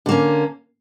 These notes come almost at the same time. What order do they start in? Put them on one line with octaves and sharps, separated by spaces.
D3 A#3 C#4